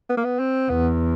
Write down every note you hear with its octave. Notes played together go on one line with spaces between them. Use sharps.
B3
A#3
B3
C4
E2 B3